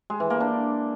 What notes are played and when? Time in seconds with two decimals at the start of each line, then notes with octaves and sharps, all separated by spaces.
0.10 G#3
0.20 E3
0.30 A#3
0.40 D4